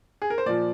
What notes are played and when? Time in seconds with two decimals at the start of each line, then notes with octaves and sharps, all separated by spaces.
0.22 G#4
0.30 A#4
0.38 C5
0.46 A#2 F3 D5